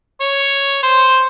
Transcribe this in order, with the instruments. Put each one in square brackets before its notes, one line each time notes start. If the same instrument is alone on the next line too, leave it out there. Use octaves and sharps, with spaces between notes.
[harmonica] C#5
C5